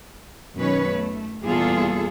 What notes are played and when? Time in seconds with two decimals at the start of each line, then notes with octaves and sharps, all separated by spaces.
0.57 F#2 B2 D#3 C#4 B4 C#5
0.89 A3
1.44 E2 A#2 G3 F4 G#4 A4